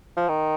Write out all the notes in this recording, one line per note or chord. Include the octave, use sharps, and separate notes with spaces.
F3
D#3